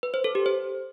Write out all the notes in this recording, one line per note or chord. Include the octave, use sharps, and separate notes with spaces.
B4
C5
A4
G4
C5